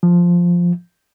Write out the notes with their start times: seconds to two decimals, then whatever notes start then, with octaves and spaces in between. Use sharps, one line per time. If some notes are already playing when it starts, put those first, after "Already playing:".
0.03 F3